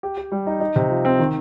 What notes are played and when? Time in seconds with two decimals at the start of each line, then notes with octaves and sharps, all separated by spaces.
0.03 G4
0.17 G4
0.32 G3
0.47 D#4
0.60 D#4
0.76 C3
0.90 F3
1.05 C4
1.19 D#3